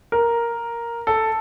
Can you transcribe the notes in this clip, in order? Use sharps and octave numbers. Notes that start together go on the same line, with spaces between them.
A#4
A4